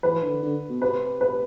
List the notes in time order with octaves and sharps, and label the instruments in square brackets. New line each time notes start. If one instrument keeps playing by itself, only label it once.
[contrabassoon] E3 [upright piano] B4
[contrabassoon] D3
D3
B2
[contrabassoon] C3 [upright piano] B4
[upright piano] B4